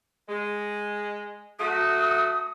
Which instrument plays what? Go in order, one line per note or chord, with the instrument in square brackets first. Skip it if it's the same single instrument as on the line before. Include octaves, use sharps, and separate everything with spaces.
[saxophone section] G#3
[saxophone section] F#3 A3 F#4 [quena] D#6